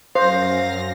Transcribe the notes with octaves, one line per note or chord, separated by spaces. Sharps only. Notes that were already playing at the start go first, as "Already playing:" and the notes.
F#2 C5 F5 A#6